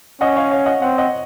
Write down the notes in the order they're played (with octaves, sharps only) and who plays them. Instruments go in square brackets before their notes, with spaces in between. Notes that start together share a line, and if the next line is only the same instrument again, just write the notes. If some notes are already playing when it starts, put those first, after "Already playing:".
[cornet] C#4 [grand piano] D#5 F#5
[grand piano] C#5 F5
C#5 F5
D#5 F#5
[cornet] C4 [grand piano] F#5
[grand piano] D#5 F#5